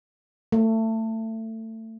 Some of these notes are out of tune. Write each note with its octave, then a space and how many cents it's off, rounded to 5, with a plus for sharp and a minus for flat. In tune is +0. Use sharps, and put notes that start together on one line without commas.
A3 +25